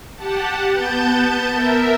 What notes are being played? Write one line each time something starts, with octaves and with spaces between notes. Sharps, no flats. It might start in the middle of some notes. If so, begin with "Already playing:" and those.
G4 F#5 A5
B3 A5 G6 A6
A#4 E5